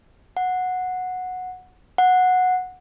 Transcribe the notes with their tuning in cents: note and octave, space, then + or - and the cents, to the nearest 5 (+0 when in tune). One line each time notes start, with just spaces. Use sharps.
F#5 -10
F#5 -10